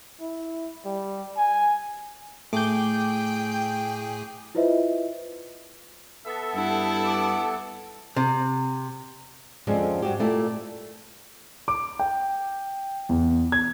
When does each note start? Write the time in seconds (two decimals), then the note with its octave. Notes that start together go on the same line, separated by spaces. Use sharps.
0.21 E4
0.85 G3
1.37 G#5
2.53 A2 A3 G#4 G5 D6 G6
4.55 E4 F4 B4 C5 D#5 E5
6.26 B3 A4 E5
6.55 G2 E4 A5
7.06 D6
8.16 C3
9.67 F2 D3 F3 G#3 C4 C#4
10.02 G2 F#4 G4
10.19 A#2 A3 E4 D5
11.68 D6
11.99 G5
13.09 E2
13.52 G#6